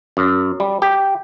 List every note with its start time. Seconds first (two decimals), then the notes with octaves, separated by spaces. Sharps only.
0.17 F#2
0.60 G3
0.82 G4